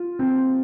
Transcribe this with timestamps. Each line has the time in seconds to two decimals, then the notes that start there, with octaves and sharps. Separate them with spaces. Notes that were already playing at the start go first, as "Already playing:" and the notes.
Already playing: F4
0.19 C4